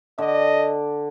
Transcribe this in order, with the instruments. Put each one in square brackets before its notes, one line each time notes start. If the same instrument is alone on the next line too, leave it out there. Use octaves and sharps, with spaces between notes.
[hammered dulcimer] D3 [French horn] D#5